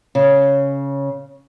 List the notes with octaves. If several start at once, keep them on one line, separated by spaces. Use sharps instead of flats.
C#3